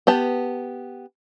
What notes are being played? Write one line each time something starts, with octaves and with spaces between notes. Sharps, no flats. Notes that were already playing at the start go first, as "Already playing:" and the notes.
B3 G4 A5